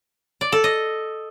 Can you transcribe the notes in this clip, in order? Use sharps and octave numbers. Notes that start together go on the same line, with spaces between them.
D5
A4
D#5